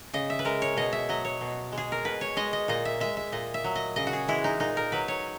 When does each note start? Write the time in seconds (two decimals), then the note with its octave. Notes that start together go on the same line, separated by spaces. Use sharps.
0.13 C#3 D#5
0.30 E5
0.39 B4
0.45 G#3 A#4
0.62 C#5
0.77 B2 D#5
0.93 E5
1.09 F#3 D#5
1.25 C#5
1.41 B2
1.72 G#3
1.78 G#4
1.92 A#4
2.05 B2 B4
2.21 C#5
2.37 G#3 D#5
2.53 D#5
2.68 A#2 D#5
2.85 E5
3.00 G#3 E5
3.17 E5
3.32 A#2 D#5
3.54 E5
3.64 F#3
3.75 D#5
3.96 C#3 D#5
4.07 F#4
4.13 G#4
4.28 E3 G#3 E4
4.44 D#4
4.60 A#2 D#4
4.77 A#4
4.92 F#3 B4
5.08 C#5